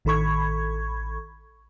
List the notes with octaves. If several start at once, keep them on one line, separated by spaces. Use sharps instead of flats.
A1 D#3 A4 B5 C#6 G#6